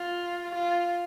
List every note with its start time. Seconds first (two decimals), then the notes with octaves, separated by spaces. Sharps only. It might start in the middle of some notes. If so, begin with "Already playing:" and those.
Already playing: F4
0.55 F4